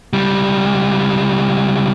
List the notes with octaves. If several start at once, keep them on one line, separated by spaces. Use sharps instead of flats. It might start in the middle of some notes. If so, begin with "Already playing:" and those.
C#2 G3